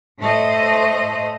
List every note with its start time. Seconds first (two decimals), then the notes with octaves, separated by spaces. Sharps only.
0.20 A2 A3 C5 D#5